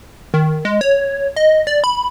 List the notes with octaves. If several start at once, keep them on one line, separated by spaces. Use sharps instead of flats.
D#3
G#3
C#5
D#5
D5
B5